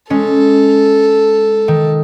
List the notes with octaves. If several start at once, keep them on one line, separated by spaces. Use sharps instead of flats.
G#3 C#4 A4
D#3